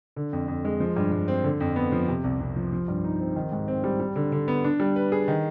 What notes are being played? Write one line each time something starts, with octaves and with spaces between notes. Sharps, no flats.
D3
F2
F2
G#3
F3
G2
G2
C4
D3
F2
B3
F3
C3
C2
C2
F3
F3
G2
D#4
C4
D#3
G#2
C4
G3
G3
D3
D3
B3
D4
G3
B4
G#4
D#3